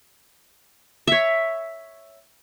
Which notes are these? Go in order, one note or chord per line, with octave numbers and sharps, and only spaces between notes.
C#5 E5